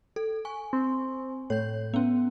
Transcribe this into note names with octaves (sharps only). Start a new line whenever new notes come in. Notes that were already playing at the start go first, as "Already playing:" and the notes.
A4
G#5 C#6
C4
A2 C#5 G6
B3 C#4